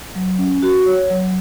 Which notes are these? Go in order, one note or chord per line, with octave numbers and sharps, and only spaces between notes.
F#3
C#4
F#4
C#5
F#3